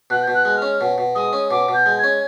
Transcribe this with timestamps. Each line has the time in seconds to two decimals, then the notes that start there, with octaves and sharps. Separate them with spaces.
0.10 B2 F#6
0.22 G6
0.28 B2
0.34 F#6
0.45 G#3
0.57 F6
0.62 C#4
0.81 B2
0.98 B2
1.15 G#3 D#6
1.33 C#4
1.50 B2 D6
1.68 B2
1.74 G6
1.86 G#3
1.98 G#6
2.04 C#4